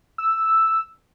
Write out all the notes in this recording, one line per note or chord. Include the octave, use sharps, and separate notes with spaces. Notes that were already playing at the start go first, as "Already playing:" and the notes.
E6